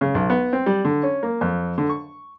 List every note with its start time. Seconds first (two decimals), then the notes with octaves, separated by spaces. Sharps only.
0.01 C#3
0.15 B1
0.30 B3
0.53 C4
0.66 G3
0.85 D3
1.03 C#4
1.23 A#3
1.41 F2
1.78 D3
1.89 C#6